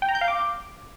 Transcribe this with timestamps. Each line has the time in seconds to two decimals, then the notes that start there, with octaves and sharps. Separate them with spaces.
0.02 G5
0.09 A#5
0.15 G6
0.21 F5
0.28 D6